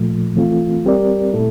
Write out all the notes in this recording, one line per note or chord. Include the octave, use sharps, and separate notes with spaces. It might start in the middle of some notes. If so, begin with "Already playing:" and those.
Already playing: A#2 F3 A3
E3 A3 C4 F4
G3 C4 G4 A#4 D5
A#2 A3 E4 A4